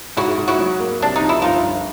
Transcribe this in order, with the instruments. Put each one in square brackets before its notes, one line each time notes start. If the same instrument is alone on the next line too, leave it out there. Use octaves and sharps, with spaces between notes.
[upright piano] G#2 [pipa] E4 F#4
[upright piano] G#2
[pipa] E4 F#4
[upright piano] F#3
A#3
[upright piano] C2 [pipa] D4
[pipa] D#4
[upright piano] F3
[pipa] E4
[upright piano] G1 [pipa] D#4 F4
[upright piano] G1